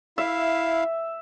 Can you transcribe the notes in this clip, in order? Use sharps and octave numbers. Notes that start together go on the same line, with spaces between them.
E4 E5 F5